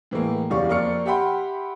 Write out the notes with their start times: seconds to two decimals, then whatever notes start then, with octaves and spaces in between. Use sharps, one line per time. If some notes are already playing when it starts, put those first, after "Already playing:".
0.11 A2 E3 G#3 A#3
0.50 F#1 E2 G3 D5 F5 C#6
0.69 F2 A#3 D5 C#6 F6 C#7
1.06 G4 E5 F#5 G5 B5 C6